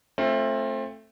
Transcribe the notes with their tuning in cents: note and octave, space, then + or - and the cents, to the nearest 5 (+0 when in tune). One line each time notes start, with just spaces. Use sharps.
A3 +0 C4 +25 F4 +0